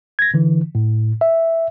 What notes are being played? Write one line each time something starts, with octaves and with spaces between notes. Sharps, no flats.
G#6 A#6
D3 E3
A2
E5